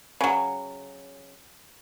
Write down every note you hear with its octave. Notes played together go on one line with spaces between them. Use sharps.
C#3 F#3